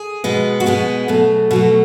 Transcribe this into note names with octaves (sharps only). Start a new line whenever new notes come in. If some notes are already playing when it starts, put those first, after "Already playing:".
Already playing: G#4
B2 G#3 B3
F#4
B2 G#3 B3 G#4
B2 F#3 A3
B2 F#3 A3 F#4